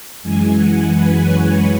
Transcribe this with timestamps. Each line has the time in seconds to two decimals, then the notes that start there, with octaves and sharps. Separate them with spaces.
0.22 F#2 E3 G#3 G#5
0.55 F#5
0.88 B4
1.21 C#5